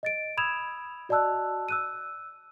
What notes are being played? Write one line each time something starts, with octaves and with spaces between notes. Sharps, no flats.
D#5 A6 D7
B5 D#6 E6 G#6 E7 F7
F#4 D5 D#5 A5 E6 F#6
E6 F#6 D#7